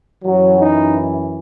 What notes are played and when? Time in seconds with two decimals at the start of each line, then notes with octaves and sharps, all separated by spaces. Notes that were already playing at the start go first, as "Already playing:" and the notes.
0.24 F#2 E3 F#3
0.60 D#4